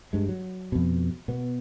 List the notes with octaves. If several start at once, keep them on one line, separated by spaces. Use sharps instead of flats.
G2 G#3
F#3
F2 B2
B2 B3